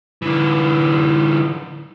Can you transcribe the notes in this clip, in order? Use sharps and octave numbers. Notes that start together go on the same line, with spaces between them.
D3 E3